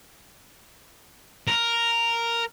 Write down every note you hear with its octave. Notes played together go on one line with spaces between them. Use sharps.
A#4